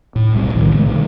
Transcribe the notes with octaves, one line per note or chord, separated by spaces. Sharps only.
A2
D1 B1 G3 C4
B1 A2 D#3 F3
G#2 C#3 G#3 A3
B2 D3 D#3 G3